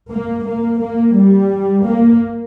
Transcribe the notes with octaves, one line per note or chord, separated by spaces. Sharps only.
A#3
A#3
A#3
G3
A#3